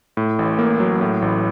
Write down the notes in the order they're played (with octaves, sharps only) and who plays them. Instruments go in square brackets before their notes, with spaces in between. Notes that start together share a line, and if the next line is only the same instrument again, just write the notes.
[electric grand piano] A2
A1
A#3
F#3
A2
A1